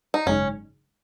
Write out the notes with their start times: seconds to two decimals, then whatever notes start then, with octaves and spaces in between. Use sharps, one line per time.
0.14 D#4
0.26 G#1 F#2 C#3 G#3 C#4 D#4